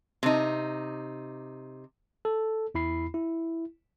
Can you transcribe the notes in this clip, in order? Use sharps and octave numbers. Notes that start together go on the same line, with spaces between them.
C3 D#4
A4
E2 E4 B5 C7
E4